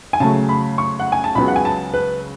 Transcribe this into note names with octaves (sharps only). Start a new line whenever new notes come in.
G#5
C#3 F#3 A3 A5
B5
C#6
F#5
G#5
A5
C#2 C#3 F#3 B3 B5
F#5
G#5
A5
B4